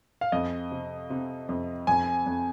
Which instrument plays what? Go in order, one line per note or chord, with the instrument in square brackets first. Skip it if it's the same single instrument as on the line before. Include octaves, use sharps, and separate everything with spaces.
[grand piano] F5
[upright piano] F2 [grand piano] D#5
[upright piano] C3
C3
F2
[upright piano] F2 [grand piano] G#5
[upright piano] F2